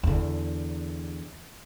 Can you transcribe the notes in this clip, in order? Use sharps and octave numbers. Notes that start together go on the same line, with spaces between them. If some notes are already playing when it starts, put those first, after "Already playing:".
E2 D3